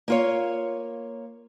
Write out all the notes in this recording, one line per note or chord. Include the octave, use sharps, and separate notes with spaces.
A#3 F4 C#5